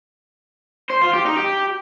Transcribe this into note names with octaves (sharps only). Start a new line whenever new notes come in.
C5
F4
G4
D#4
G4